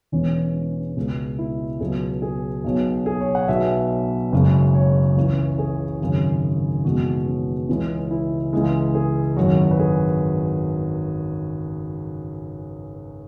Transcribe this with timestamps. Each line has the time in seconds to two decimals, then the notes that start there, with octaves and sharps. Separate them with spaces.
0.12 E1 E2 E3 G#3 C#4
0.97 C#2 B2 G#3
1.38 E4
1.80 C#2 B2 F#3 G#4
2.22 G#4
2.64 B1 B2 F#3
3.06 G#4
3.21 C#5
3.35 F#5
3.48 B1 B2 F#3 E5
4.32 F#1 F#2 C#3 G#3
4.75 C#5
5.16 C#2 C#3 E3
5.58 G#4
6.00 G#1 F#2 C#3
6.85 F#1 E2 B2 G#3 F#4
7.27 C#4
7.68 C#2 C#3 E3 G#3 C#4
8.11 E4
8.53 C#2 C#3 E3 G#3
8.95 G#4
9.36 G#1 F#2 F#3 F#4
9.71 B4
9.79 G#4